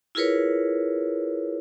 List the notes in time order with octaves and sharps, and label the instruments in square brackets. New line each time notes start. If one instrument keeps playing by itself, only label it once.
[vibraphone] E4 F4 G#4 A#4 B4 C#5